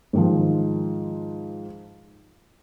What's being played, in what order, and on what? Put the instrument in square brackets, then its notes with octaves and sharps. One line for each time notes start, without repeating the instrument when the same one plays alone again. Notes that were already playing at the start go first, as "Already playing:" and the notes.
[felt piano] G#2 D#3 F3